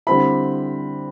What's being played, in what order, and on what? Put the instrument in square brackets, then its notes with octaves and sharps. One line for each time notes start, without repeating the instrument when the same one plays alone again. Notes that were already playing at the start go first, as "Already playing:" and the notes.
[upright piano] D3 G3 C4 E4 B5